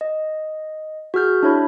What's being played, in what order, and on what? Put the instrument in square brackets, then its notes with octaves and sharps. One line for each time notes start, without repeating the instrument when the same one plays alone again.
[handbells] D#5
F#4 G#4 F6 G6
D4 E4 C#5 B5